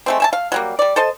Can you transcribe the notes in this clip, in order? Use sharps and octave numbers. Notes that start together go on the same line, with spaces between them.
G#3 A3 C4
E5 G#5 A5
F5
F#3 G3 A#3
G3 D5
A4 C5 D#5 A5